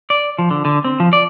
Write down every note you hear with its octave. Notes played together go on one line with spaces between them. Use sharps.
D5
F3
D3
D3
C4
F3
D5